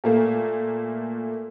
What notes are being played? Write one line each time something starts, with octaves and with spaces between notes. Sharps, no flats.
A#2 A3 A#3